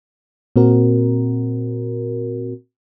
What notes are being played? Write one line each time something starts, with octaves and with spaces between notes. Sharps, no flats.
A#2 C4 F#4 A#4